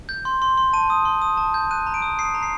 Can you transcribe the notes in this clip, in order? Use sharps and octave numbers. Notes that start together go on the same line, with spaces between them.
G6
C6
C6
C6
A5 D#7
D#6
C6
D#6
A5
G6
F#6 D#7
A#5
D7
D#6
D#6 C7
A#5
C7